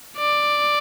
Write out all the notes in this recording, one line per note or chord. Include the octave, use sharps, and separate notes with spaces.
D5